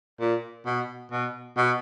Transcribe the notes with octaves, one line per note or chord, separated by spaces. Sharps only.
A#2
B2
B2
B2